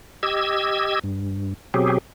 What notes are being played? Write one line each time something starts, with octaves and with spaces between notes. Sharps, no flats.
G4 D#5 E6 G#6
G2
B2 F#3 C4 G4 G#4